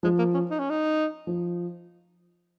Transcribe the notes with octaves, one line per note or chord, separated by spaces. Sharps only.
F3 G#3
A#3
C#4
D#4
C#4
D#4
F3